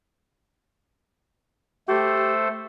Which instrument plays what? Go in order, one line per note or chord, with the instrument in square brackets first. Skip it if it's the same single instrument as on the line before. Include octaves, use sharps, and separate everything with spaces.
[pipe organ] A3 A4 C5 [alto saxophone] G4